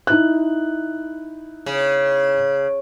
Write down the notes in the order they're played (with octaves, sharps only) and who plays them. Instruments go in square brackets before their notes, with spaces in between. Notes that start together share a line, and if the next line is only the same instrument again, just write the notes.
[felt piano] D#4 E4 F#6
[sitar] C#3